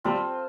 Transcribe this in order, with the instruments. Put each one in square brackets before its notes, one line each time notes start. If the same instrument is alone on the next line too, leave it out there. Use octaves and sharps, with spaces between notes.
[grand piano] G3 [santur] C4 F4 A4 C5